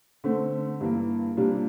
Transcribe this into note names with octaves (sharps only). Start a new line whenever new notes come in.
D3 A3 C4
G2 E3 A#3
C3 G3 A#3 D4 F4